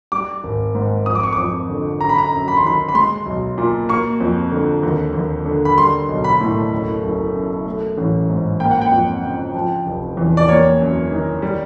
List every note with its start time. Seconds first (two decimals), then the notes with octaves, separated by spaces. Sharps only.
0.12 G3 D6
0.44 G#1
0.75 G#2
1.06 F2 D#6
1.15 D6
1.23 C#6
1.33 D6
1.38 F2
1.69 D3
2.00 F#2 A#5
2.09 B5
2.18 A#5
2.32 F#2
2.48 B5
2.57 C6
2.63 D#3 B5
2.88 B5
2.95 G#3 C6
3.26 B1
3.58 A#2
3.89 A#3 C#6
4.20 F2
4.52 D3
4.83 D#2
5.14 D#2
5.46 D3
5.65 B5
5.77 G3 C6
6.09 B1
6.24 B5
6.40 A2
6.72 F#1
7.03 F#1
7.34 F#2
7.66 A3
7.98 A1
8.29 G#2
8.60 A#3 G5
8.71 F#5
8.82 G5
8.91 F2
9.23 C#3
9.54 F3
9.86 F1
10.17 E2
10.37 D5
10.48 A#3 C#5
10.80 F#2
11.11 D#3
11.42 G3